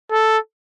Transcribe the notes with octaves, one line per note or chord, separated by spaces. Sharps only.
A4